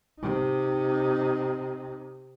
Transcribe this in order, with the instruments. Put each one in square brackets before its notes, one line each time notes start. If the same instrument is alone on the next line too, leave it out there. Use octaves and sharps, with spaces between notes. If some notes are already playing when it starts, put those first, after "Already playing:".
[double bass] C3 D#4